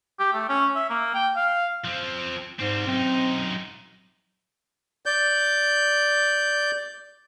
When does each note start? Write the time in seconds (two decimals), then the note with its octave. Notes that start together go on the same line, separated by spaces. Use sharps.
0.19 G4
0.33 A3
0.49 C#4
0.75 E5
0.90 A#3
1.14 G5
1.36 F5
1.84 F3 C4
2.59 G#2 G3 C4
2.87 F#2 C4 D#4
5.06 D5 G6